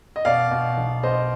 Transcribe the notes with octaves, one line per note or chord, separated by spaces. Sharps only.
D#5
B2 D5 F5
B2
B1
B2 C5 D#5